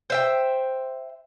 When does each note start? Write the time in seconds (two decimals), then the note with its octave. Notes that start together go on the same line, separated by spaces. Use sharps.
0.10 C5 E5 G5